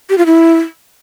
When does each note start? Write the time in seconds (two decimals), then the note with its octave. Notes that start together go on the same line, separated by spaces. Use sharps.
0.10 G4
0.18 F4
0.26 E4